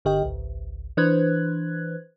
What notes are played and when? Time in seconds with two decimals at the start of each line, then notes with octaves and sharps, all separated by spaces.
0.05 G1 D3 G4 D#5 G5
0.23 G#1 C#2
0.97 E3 D4 B4 C5 F#6 G#6